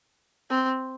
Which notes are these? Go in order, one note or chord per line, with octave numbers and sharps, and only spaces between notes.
C4